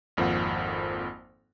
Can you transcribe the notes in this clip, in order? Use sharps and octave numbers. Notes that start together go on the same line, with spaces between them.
G#1 F2 A#3 F4 C5 F#5